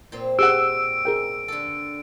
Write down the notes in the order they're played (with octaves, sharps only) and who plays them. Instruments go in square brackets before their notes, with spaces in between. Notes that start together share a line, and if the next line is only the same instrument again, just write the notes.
[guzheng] A#2 C4
[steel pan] G4 G#4 F#5 [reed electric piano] E6 [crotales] D7
[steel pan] G#4 A#4 G5
[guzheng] D3 A4